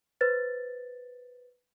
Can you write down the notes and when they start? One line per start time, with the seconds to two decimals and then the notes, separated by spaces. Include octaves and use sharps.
0.21 B4 C5 A6